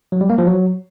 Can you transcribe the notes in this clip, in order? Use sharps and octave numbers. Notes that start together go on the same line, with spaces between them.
F#3
G3
A#3
F3
F#3